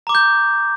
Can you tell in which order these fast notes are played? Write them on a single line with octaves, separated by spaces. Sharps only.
A#5 D6 C#6 G6